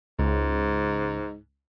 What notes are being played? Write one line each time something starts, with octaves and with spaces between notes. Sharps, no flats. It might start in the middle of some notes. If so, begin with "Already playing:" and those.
C#2 G#2